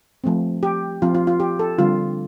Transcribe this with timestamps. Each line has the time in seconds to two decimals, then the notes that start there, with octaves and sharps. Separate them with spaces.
0.24 F3 A3 C4
0.63 G4
1.02 F3 C4 F4
1.15 F4
1.27 F4
1.40 G4
1.59 A4
1.79 D3 G3 C4 F4